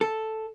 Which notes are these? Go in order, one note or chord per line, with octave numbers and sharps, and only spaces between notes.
A4